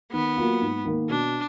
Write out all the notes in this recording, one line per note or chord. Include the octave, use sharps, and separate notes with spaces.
D#3 B3
F#3 A#3 F4
G#2
D#3 A#3
B2 D4